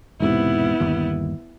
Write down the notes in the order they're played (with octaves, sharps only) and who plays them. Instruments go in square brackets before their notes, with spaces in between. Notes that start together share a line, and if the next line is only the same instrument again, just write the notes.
[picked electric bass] E1 G#2 C3 [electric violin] B3 E4
[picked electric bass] G1 D#2